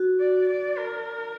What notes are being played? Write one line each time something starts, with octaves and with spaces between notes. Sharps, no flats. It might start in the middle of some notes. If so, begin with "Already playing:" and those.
Already playing: F#4
D5
D5
A#4